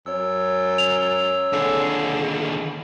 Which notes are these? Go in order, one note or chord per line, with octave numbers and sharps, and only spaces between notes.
F#2 C#5 E6
F7
D#2 D3 G#4